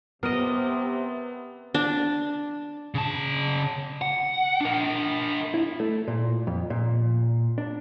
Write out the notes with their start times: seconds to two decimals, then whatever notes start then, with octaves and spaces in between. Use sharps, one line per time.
0.23 C3 B3 A#4 D#5
1.74 D4
2.95 C#3 A5
4.02 F#5
4.61 D4 A#4
5.54 E4
5.80 A3
6.08 A#2
6.47 F2
6.70 A#2
7.58 D4